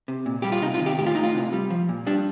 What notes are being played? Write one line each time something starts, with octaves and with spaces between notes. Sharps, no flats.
C3
A#2
G3 G4
F4
C3 D#4
F4
D#3
G4
A2 G4
F4
A2 D#4
F4
C3
G3
F3
A#2
G3 D4